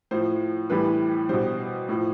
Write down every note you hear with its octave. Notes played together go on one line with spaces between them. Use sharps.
A2 F3 C5
A2 E3 G3 B4
B2 G3 C5
A2 F3